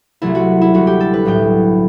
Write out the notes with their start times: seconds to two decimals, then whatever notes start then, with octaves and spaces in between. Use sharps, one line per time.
0.22 C2 C3 F#3 A3 E4
0.35 F#4
0.61 E4
0.74 D2 C3 G3 F#4
0.87 G4
1.00 A4
1.13 B4
1.25 B1 A2 F#3 A3 G5